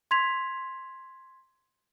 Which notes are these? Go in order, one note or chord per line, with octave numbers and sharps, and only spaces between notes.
C6 G#6 B6 F7